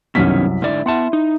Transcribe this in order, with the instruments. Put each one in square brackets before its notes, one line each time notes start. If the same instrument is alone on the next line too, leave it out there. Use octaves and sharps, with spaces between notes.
[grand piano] C2 F#2 B6 [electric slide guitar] B2 D#3 C#4
[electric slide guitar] G#2 D3 D5 [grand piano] E4
[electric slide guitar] B3 F#5 A5 [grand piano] E4 C6
[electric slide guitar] D#4